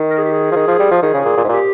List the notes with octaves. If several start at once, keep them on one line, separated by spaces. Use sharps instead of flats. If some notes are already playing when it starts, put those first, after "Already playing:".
Already playing: D#3
A#4
G#4
G4
G#4
F3
D#3
F3
G3
F3
D#3 G#4
C#3
A#2
A#2
G#2
A#2 G4